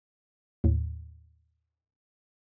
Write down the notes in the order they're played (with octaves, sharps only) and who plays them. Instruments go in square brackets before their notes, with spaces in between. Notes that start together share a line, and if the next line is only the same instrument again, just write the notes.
[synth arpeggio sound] D#2 A2